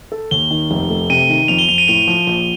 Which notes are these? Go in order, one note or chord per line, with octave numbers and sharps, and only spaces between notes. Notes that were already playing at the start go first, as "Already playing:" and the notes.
A4
D#2 G7
D#3
F1
A3
C3 D#7
D#3
F2 F7
G7
F2 F7
D#7
A2 F7
F3
A#1